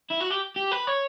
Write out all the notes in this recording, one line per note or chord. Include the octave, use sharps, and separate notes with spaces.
E4
F#4
G4
G4
B4
C#5